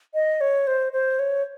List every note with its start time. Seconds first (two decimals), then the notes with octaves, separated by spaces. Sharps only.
0.14 D#5
0.41 C#5
0.67 C5
0.93 C5
1.19 C#5